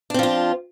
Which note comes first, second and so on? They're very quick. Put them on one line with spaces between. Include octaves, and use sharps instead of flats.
D4 C4 F3 F4